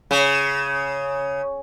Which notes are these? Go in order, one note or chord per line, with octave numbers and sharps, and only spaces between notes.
C#3